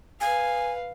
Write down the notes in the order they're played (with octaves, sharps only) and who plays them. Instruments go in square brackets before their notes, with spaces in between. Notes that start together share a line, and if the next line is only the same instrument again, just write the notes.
[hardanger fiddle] B4 F5 [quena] G#5